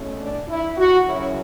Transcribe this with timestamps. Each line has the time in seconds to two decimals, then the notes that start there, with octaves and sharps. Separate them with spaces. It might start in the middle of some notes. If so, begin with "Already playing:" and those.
Already playing: E2 B2 A3 C#4
0.20 D4
0.48 E4
0.77 F#4
1.06 F#2 C#3 F#3 C#4 E4